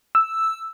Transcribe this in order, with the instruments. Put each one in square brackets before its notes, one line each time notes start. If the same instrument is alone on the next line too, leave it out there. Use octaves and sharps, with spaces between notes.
[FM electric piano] E6